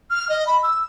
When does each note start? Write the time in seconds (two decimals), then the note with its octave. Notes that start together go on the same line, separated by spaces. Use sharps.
0.11 F6
0.29 D#5
0.47 B5
0.63 E6